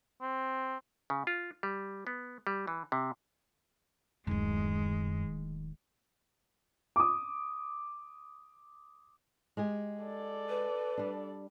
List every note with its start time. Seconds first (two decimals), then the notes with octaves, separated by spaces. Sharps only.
0.21 C4
1.10 C#3
1.27 F4
1.63 G3
2.07 B3
2.47 G3
2.67 E3
2.92 C3
4.27 D1 F#2 D#3 G#3
6.96 D6 D#6
9.57 G#3 G4 G#4
10.02 A4 D5
10.49 B4
10.98 G3 D4